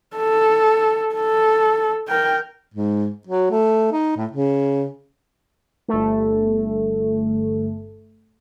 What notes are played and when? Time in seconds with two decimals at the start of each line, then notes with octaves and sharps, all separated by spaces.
0.16 A4
1.15 A4
2.08 A#4 G5
2.74 G#2
3.27 F#3
3.51 A3
3.92 D#4
4.16 A2
4.31 C#3
5.88 G1 A3